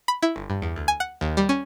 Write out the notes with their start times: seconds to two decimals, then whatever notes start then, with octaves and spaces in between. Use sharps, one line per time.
0.08 B5
0.22 E4
0.36 G1
0.50 G2
0.62 E2
0.76 D2
0.88 G#5
1.00 F#5
1.21 D#2
1.37 G3
1.49 C#4